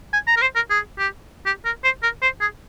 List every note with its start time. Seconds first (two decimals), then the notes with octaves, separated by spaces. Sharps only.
0.13 G#5
0.27 A#5
0.37 A#4
0.41 C5
0.55 A#4
0.70 G#4
0.99 G4
1.46 G4
1.65 A#4
1.84 C5
2.03 A#4
2.22 C5
2.41 G#4